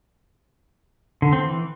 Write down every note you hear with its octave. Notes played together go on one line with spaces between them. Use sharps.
D3
C4
E3